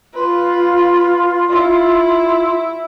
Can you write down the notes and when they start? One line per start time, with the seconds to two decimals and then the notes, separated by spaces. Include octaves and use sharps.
0.14 F4 B4 C6
1.49 E4